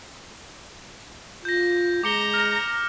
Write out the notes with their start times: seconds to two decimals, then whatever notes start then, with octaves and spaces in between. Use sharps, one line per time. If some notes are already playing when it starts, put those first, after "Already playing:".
1.45 F4 G6 A#6
2.04 G#3 A#5 D6 C#7 G7
2.34 F6